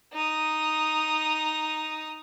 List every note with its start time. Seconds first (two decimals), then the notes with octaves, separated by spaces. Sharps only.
0.13 D#4 D#6